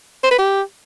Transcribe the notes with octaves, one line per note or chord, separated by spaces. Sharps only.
C5
B4
G4